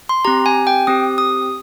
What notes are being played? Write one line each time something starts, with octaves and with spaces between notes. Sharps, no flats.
C6
C4 G4 A#5
G#5
G5
C4 G4 D#6
D#6